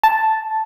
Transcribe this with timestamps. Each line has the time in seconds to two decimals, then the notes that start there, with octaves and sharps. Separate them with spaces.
0.04 A5